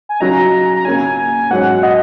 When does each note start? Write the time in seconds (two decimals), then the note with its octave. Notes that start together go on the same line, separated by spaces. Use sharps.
0.09 G#5
0.20 C#3 F#3 D#4 A#5
0.76 A#5
0.85 C#3 A#3 C#4 G#5
1.51 G#2 F#3 C#4 F#5
1.83 D#5